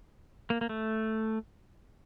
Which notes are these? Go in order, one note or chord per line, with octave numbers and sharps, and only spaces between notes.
A#3
A#3
A3